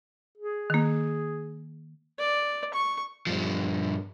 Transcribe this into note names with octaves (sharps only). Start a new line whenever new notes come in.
G#4
D#3 A#3
D5
C#6
G2 F3